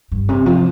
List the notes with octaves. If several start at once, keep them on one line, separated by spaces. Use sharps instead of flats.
G2
C3
F3